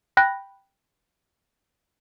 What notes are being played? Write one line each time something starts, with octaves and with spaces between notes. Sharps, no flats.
G5 B5 F#6 A#6